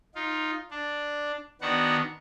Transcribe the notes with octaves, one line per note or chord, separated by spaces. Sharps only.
D#4 F4
D4
D#3 B3 D4 F#4 F#5